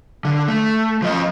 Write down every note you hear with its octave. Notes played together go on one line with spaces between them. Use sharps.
D3
A3
F3 D#5